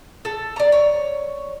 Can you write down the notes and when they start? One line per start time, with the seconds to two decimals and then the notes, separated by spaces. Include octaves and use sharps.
0.25 A4
0.56 D5 A#5
0.72 C#5